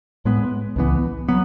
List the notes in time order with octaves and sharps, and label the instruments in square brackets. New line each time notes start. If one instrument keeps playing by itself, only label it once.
[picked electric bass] A2 G#3 B3
C#2 C#3 E3 B3
F#3 B3